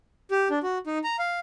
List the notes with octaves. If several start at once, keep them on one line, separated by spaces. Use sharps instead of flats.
G4
D4
F#4
D#4
A#5
F5